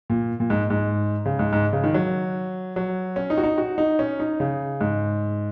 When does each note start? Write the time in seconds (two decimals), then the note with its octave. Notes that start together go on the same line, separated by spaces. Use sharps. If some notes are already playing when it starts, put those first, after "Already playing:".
0.10 A#2
0.40 A#2
0.50 G#2
0.70 G#2
1.26 C#3
1.39 G#2
1.53 G#2
1.73 C#3
1.84 D#3
1.94 F#3
2.76 F#3
3.16 C#4
3.30 D#4
3.38 F#4
3.43 D#4
3.58 F#4
3.78 D#4
3.99 C#4
4.20 D#4
4.40 C#3
4.81 G#2